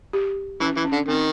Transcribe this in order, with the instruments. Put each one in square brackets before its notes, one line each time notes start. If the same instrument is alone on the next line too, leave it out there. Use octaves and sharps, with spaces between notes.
[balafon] G4
[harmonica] E3 [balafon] C#4
[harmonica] E3
[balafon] C#4
[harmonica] D3
[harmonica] D#3 [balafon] C4